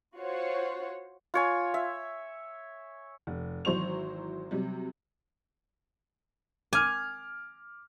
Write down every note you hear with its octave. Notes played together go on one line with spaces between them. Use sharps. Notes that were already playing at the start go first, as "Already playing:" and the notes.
F4 F#4 C5 C#5
F4 C#5 G#5
E5
F1
G#1 E3 F#3 C5 C#6 F7
C3 F#3 G3
G#5 D6 F6